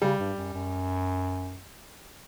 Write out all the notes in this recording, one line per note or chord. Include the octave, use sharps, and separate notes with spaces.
C#3 G3
G2
F#2
F#2